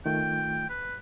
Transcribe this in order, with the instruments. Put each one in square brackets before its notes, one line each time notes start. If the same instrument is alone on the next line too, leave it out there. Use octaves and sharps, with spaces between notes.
[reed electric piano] D#3 A3 F4 [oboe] G5
[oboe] B4